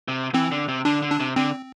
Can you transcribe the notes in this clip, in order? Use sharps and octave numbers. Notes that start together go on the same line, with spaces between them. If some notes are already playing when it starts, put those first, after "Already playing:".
C3
E3 C4
D3
C3
D3 D4
D3
D4
C3
D3 C4